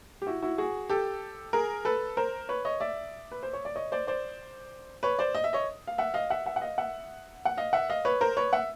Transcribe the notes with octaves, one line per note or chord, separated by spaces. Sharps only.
G4
E4 F#4
E4 F#4
F#4 G#4
G4 A4
G#4 A#4
A4 B4
A#4 C5
B4 C#5
C#5 D#5
D5 E5
B4
C5
C#5
D5
C#5 D#5
C5 D5
C5 D5
B4 C#5
C5 D5
D#5
E5
C#5 D#5
F5
E5 F#5
D#5 F5
E5 F#5
E5 F#5
F#5
D#5 F5
E5 F#5
F#5
D#5 F5
E5 F#5
D#5 F5
B4 C#5
A#4 C5
B4 C#5
E5 F#5